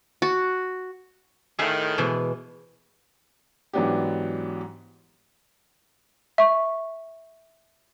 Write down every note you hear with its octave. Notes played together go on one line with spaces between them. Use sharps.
F#4
A2 D#3 G#4 E5 F5
B2 E3 G#3
G#2 E3 F#3 B3 D4 G4
E5 C#6